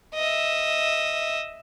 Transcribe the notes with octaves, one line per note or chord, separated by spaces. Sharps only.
D#5 E5